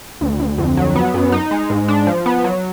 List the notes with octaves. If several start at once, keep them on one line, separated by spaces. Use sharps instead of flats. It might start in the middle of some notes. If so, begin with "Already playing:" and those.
D2
D2
F2
F#3
B3
F#2
D#4
G#3
G#2
D4
F3
B3
F#3